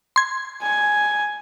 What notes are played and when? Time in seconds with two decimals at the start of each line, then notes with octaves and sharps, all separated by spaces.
0.16 C6 G#6
0.62 G#5